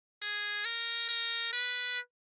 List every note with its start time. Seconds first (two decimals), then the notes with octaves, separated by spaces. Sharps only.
0.22 G#4
0.65 A#4
1.09 A#4
1.53 B4